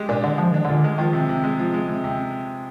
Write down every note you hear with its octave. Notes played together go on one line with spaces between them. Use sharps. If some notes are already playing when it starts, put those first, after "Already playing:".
Already playing: G#3 G4
A#2 D4
D3 D4
F3 G#3
D#3 D4
A#2 D3
D#3
G#3
D#3 F3
C3
C3
G#3
F3
G#3
C3
C3